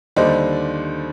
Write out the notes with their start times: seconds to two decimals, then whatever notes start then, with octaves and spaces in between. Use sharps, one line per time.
0.16 D#2 D3 G3 D4 C5 D#5